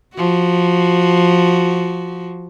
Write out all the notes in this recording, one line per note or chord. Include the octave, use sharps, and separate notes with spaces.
F3 F#4